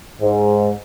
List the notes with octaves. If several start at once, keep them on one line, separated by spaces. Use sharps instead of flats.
G#2